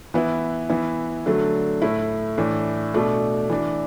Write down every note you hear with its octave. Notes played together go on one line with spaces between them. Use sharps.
E3 B3 E4
E3 B3 E4
D3 F#3 A3
A2 A3 E4
A2 E3 D4
B2 A3 D4
E3 D4